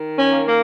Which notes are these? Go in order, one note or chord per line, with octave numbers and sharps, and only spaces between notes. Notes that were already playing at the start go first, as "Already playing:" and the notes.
Already playing: D#3
C#4
A#3
A#3